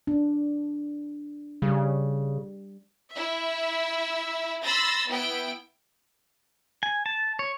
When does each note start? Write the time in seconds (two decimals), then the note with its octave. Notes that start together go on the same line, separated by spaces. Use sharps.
0.07 D4
1.62 C#3 G3
3.13 E4 E5
4.62 B5 C6 E6 A6 A#6
5.08 B3 E4 G5 D7
6.83 G#5
7.06 A5
7.39 C#5